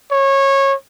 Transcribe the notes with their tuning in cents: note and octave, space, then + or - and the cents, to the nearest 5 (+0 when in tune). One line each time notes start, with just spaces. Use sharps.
C#5 -20